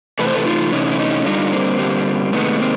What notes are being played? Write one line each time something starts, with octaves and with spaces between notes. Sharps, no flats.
C3 E3 A3 B4
C5
A4 B4
D#4 F4
C3 E3 A3 C#4 D#4
E4
C#4 D#4
G2 D3 G3 D#4 F4
C#4
A#3 C4
G2 D3 G3
C3 D#3 G#3 A3 B3
A#3 C4